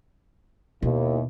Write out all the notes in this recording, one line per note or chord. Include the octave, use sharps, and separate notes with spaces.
D#2 B2 E4